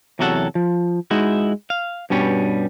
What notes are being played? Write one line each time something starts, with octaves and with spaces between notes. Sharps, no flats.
E2 C3 F#3 F#4 A4 F#5
F3
G#3 D#4 E4 F#4
F5
G2 B2 G3 C#4